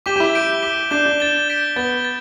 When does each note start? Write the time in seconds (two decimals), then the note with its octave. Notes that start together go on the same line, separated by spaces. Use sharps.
0.06 G4 D6 B6 E7 G7
0.16 G4
0.20 E4
0.34 G6 D7 G7
0.62 D6 B6 E7 G7
0.91 D4 G6 E7 G7
1.06 D4
1.20 A6 E7 G7
1.48 G6 B6 D7 G7
1.76 B3 A6 G7
2.05 A6